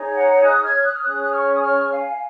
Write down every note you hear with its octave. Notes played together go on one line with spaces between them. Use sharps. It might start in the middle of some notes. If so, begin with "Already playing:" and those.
Already playing: D#4 G#4 C#5
F#5 A#5
D#6 F#6
F6 G#6
D#6 F#6
F6
C#4 G#4 C#5 D#6 F#6
F#6
C#6 F6
D#6
C#6 F6
F5 G#5
F5